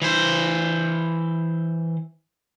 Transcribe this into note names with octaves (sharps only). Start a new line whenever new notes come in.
E3 C5